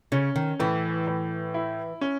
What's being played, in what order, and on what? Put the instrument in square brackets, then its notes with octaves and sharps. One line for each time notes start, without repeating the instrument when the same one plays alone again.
[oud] C#3 [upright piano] C#4
[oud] D#3
[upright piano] A2 [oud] E3
[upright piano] A2
E4
C#4